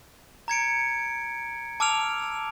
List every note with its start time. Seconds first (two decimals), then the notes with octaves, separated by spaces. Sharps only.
0.48 A#5 G#6 C#7 D7
1.80 A5 D6 E6 F6 D7 F7